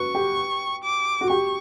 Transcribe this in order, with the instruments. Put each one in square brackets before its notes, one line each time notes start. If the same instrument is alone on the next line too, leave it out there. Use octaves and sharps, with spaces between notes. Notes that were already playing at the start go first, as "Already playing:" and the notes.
Already playing: [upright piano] F#4 B4 [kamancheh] C#6
[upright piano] G4
[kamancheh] D6
[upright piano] F#4
[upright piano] G4 [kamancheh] C#6